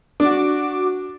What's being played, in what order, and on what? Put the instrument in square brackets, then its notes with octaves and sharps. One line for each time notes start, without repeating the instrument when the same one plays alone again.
[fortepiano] D4 [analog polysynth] F#4 D6